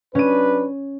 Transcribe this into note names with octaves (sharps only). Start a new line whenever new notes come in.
F#3 C#4 D4 B4 D#7